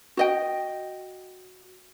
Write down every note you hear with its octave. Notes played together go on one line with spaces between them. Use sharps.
F#4 D#5 G5